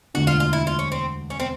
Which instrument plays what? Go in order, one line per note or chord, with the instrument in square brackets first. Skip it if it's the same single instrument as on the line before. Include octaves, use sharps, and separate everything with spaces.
[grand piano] E1 D2 D3 [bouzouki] F#4
[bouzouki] F4
F4
E4
F4
C#4
C4
C#4
C4